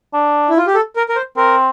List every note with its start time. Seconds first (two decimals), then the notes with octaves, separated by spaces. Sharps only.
0.14 D4
0.49 E4
0.58 F4
0.67 G4
0.75 A4
0.96 A#4
1.09 A#4
1.16 C5
1.37 C4 A#4